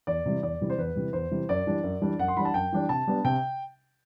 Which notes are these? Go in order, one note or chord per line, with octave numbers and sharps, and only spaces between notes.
E2 D5
C3 E3 G3
E2 D5
C3 E3 G3
C5
E2 B4
C3 E3 G3
E2 C5
C3 E3 G3
F#2 D5
E3 G3 D4
F#2
E3 G3 D4
F#2 F#5
C6
E3 G3 D4 B5
A5
F#2 G5
E3 G3 D4
C3 A5
G3 B3 D4
C3 G5